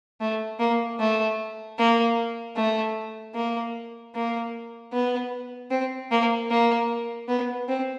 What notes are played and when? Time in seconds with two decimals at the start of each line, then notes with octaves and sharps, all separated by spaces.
0.21 A3
0.59 A#3
0.99 A3
1.78 A#3
2.56 A3
3.34 A#3
4.14 A#3
4.93 B3
5.71 C4
6.11 A#3
6.50 A#3
7.28 B3
7.68 C4